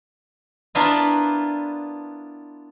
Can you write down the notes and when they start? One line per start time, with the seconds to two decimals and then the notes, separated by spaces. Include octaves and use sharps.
0.75 B3 D4 E4 F4 A#4 B4